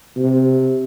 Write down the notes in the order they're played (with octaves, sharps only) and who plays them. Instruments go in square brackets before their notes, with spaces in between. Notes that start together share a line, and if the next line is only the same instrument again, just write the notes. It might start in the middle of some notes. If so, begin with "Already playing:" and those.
[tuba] C3